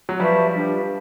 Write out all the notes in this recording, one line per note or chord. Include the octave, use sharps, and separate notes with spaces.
F#3
F3 G3 B4 E5 A5 C#6
D4 G4 B4